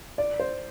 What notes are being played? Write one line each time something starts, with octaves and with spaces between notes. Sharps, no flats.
D5
C5